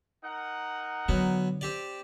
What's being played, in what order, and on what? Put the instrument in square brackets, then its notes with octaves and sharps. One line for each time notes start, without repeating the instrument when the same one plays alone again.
[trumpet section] D#4 A#4 F#5
[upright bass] D3 [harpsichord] F#3 B3
[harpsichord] C4 G4 D5